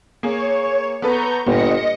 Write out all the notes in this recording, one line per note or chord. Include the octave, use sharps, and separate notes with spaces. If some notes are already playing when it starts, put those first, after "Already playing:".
A#3 G#4 C#5
B3 A4 B4 A#5 C#6 G6
G1 A#2 D#5 A#6 C#7